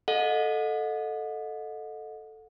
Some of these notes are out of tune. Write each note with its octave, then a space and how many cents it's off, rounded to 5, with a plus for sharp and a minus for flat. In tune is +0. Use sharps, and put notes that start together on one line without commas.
A4 +0 D#5 +0 F#5 -40